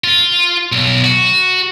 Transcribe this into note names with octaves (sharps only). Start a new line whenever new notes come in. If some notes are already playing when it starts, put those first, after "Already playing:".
F4
B1
F#4